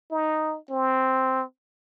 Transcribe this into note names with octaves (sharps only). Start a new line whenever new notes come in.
D#4
C4